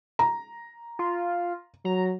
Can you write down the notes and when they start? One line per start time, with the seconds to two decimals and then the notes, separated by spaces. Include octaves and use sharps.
0.19 A#5
0.99 F4
1.85 F#3 A#5